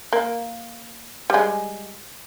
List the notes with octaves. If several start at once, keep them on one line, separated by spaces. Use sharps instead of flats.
A#3
G3 G#3